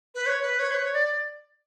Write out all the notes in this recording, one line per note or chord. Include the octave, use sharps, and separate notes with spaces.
B4
C#5
B4
C#5
B4
C#5
D5